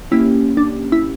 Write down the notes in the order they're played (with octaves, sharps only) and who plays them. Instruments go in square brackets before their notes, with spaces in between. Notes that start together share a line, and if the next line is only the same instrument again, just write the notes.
[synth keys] A#3 C#4 G4 [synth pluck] E4
[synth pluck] D4
E4